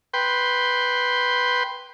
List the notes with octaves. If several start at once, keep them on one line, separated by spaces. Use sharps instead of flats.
B4 G5 C6